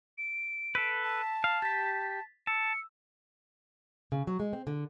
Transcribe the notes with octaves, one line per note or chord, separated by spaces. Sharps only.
D7
A4 B4 E6 B6
A5
F5
G4 A6 B6
A5 E6 C#7
C#3
F#3
G#3
C4
D3